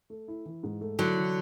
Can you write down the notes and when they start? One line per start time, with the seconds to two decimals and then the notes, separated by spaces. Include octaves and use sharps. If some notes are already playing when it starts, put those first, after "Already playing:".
0.10 A3
0.28 E4
0.46 E3
0.63 G#2
0.81 A3
0.99 D3 F#3 E4
1.17 E3